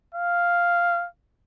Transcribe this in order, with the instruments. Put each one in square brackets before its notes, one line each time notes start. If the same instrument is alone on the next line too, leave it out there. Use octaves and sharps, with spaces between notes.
[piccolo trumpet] F5